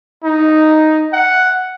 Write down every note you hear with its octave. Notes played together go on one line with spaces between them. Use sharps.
D#4
F#5